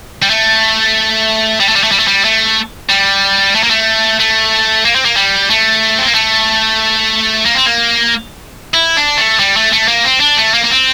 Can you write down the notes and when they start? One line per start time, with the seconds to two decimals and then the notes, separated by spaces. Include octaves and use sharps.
0.22 G3
0.30 A3
1.60 G3
1.68 A3
1.76 G3
1.83 A3
1.92 G3
1.99 A3
2.08 G3
2.25 A3
2.89 G3
3.55 A3
3.63 A#3
3.70 A3
4.19 A3
4.85 A#3
4.95 C4
5.05 A#3
5.17 G3
5.50 A3
5.99 C4
6.07 A#3
6.15 A3
7.45 A#3
7.55 C4
7.66 A#3
8.74 E4
8.97 D4
9.18 A3
9.40 G3
9.57 A3
9.73 A3
9.88 A#3
10.05 C4
10.21 D4
10.37 A3
10.54 A#3
10.64 A#3
10.70 C4